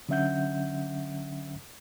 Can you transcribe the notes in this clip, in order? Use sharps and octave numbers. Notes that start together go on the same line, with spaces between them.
D3 F#3 C#4 E5 F#5 G6